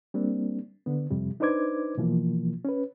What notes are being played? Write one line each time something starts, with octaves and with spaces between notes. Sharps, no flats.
G3 A#3 C4 D4
D3 B3
F2 C3 G3
D4 D#4 B4 C5 D6 G#6
B2 E3 F3 A#3
C#4 B4